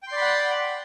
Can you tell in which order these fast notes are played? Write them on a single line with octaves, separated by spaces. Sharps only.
G5 C6 D5 B5 F#5